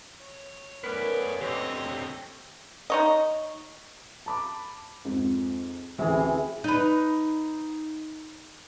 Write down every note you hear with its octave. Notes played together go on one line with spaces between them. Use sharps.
C#5
A3 B3 C#4 A#4 B4 D5
D3 C4 G4 C#5 D#5
D#4 C#5 D#5
A5 B5 D6
F2 G#2
A1 D2 C3 E3 G#4
D#4 B4